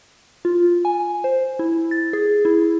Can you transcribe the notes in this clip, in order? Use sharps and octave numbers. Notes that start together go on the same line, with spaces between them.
F4
G#5
C5
E4
A6
G#4
E4